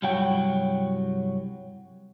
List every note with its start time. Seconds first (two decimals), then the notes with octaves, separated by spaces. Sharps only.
0.02 C2 G2 F#3 F#4 G5